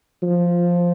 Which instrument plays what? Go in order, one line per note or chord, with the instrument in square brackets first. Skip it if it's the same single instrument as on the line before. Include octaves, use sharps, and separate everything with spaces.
[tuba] F3